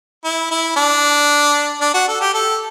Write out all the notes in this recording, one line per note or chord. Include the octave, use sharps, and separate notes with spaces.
E4
E4
D4
D4
F#4
A4
G4
A4